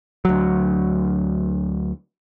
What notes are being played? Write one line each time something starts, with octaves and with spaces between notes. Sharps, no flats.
D2 F#3